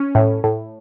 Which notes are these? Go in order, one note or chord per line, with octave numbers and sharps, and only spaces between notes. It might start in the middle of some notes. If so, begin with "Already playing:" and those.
Already playing: C#4
A2
A2